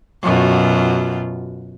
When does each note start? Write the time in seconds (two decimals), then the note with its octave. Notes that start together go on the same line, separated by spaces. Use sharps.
0.23 F#2 B2 F4